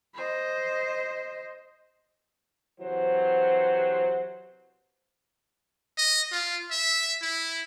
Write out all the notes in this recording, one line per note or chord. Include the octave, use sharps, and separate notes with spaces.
C5 D#5
C3 E3 F#3 C5
D#5
F4
E5
E4